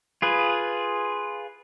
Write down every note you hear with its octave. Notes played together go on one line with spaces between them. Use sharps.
F4 G#4 B4